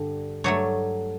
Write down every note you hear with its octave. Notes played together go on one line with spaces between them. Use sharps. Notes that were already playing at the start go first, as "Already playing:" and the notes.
Already playing: G2 D3 G3
G2 F#3 A3 C#5